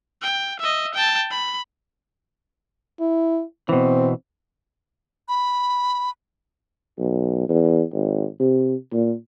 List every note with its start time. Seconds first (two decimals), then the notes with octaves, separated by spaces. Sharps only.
0.22 G5
0.59 D#5 E5
0.94 G5 A5
1.31 B5
3.00 E4
3.69 B2 E3 C4
5.29 B5
6.99 B1
7.49 E2
7.93 G#1
8.40 C3
8.93 A#2